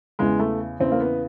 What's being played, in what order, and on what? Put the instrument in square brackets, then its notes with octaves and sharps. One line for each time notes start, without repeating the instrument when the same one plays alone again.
[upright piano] E2 C#3 E3 G#3
A3
E2 C#3 E3 C4
A#3
B3